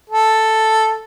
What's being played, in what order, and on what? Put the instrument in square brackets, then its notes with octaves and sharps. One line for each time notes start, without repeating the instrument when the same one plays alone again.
[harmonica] A4